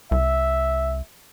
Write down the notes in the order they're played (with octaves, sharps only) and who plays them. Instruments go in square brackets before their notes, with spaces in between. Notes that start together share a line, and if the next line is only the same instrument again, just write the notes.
[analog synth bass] C2 [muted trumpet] E5